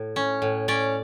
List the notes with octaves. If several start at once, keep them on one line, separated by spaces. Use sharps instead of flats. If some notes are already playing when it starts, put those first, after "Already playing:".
Already playing: A2
C#4
A2
C#4 D5